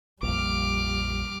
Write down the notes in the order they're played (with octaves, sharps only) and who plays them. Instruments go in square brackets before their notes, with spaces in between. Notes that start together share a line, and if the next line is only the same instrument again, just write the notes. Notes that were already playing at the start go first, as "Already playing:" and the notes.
[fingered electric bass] A#1 F2 [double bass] G3 [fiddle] D6 F6